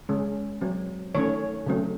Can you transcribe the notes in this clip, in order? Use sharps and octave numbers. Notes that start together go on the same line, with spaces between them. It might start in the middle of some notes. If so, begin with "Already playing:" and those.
C#3 G#3 C#4
F#3 C4
D#3 A3 C#4 C#5
C#3 F#3 A3 C4